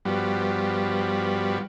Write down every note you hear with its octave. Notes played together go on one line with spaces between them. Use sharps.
G2 F3 G3 B3 F#4